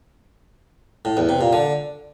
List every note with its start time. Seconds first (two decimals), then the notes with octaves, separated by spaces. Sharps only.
1.05 A2
1.17 E2
1.29 C3
1.41 A#2
1.53 D3